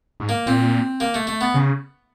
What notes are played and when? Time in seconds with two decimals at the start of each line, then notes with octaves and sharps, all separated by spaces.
0.20 G#2
0.29 A#3
0.46 A#2 C4
1.00 A#3
1.14 A3
1.27 A3
1.41 B3
1.54 C#3